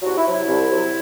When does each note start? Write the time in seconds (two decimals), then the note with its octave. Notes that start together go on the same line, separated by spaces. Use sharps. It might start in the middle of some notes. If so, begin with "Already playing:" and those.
0.02 C2 F#3 F#4
0.17 E4
0.25 C3 F#3
0.33 E4
0.47 C2
0.70 C3 F#3